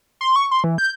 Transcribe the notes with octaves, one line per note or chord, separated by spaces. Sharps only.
C6
C#6
C6
E3
G6